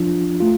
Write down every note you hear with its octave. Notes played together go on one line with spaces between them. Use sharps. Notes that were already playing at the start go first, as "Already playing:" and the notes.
Already playing: F3 D4 F4
A3 F4